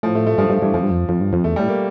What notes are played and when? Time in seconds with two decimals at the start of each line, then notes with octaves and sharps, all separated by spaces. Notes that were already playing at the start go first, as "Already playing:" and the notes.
0.03 A2 F3
0.15 A3
0.27 A3
0.38 G2 F3
0.50 G2 F3
0.62 G2 E3
0.74 F2 F3
0.83 G2
0.91 F2
1.09 F2
1.21 G2
1.33 F2
1.44 E2 A3
1.56 A2 G3
1.68 A#3